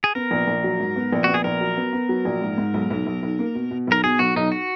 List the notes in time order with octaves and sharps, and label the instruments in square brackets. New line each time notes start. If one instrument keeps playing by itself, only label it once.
[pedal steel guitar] G#4
[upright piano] B3 [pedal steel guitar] A#4
[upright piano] A#1
A#1
F#3
G#2
B3
A#1
[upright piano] B3 [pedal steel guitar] F#4
[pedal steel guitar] G#4
[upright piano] A#1 [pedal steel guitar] A#4
[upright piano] F#3
B3
B3
F#3
A#1
G#2
G#2
B1
B1
B1
B1
A#3
B2
B2
[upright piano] B1 [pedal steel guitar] A#4
[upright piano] B2 [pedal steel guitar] G#4
[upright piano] B1 [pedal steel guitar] F#4
[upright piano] B1 [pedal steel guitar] D#4
[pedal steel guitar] F#4